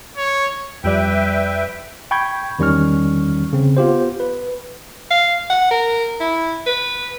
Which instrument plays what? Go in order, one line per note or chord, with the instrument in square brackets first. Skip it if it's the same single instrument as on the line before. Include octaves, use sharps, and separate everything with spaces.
[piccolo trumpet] C#5
[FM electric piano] F2 G3 D5 [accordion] B4 E5 G5
[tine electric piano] G5 B5 C#6 G6 G#6
E2 D#3 G3 C#4 C#6 F6
C#3 C4
B3 F4 G4 C5
B4
[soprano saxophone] F5
F#5
A#4
E4
B4